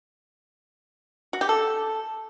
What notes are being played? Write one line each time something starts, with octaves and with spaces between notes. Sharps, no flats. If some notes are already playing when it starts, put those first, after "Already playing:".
F#4
G4
A4